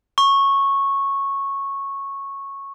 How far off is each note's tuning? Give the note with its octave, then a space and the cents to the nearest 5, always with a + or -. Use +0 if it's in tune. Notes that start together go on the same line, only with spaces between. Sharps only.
C#6 -10